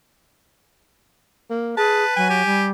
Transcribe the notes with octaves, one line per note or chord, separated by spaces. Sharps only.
A#3
G#4 B4 A5
F#3 G#5
G4
G3